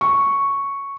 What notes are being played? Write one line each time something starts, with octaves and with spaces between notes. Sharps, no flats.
C#6